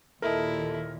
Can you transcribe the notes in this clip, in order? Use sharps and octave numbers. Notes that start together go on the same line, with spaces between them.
D#2 A#2 E4 A4 A#4 D#5 E5 A5